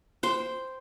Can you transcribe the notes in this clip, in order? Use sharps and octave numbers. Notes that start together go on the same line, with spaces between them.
C5 G5